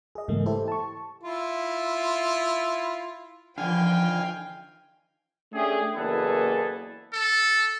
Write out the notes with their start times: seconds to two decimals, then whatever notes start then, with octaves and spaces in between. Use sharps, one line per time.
0.15 G#4 D#5
0.28 G#2 C#3 E3 A3 A#3
0.46 E4 G4 A4 C5
0.68 A5 C#6
1.23 E4 F4
3.58 D3 E3 F3 F5 G5 G#5
5.52 A3 C#4 D4 G4 G#4
5.96 F#1 E2 A#3 G#4 A4 B4
7.13 A4